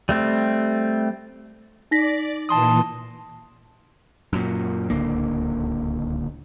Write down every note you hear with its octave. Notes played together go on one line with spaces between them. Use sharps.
G3 A3 C4
D#4 D5 A#6 B6
A#2 E3 A5 C6 D#6
F#2 A#2
D1 C#2 D3 A#3